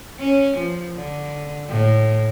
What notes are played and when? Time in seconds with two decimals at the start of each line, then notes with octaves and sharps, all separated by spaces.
0.20 C#4
0.58 F3
0.96 D3
1.69 A2